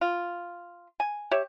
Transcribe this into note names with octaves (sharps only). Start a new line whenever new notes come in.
F4
G#5
G4 C#5 E5